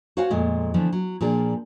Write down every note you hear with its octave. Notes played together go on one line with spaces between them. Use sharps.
F#4 C5 C#5 F5 F#5 G#5
F2 A#2 G#3 A3
D3 E3 F3 A3 B3
F#3
A#2 F3 D4 G#4